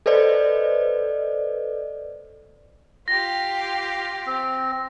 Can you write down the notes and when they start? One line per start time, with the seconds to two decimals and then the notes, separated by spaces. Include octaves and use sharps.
0.06 A4 B4 C5 D5 D#5
3.08 F4 G4 A#6
4.27 C4